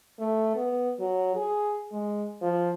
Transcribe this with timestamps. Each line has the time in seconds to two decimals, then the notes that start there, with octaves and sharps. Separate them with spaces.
0.19 A3
0.56 B3
1.00 F#3
1.36 G#4
1.92 G#3
2.42 F3